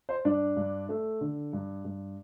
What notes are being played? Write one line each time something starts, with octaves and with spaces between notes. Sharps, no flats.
C5
G2 D4 D5
G2
A3
D3
G2
G2